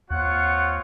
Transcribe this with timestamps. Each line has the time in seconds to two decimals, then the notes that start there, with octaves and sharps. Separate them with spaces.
0.11 D#2 C4 F4 C#5 F#5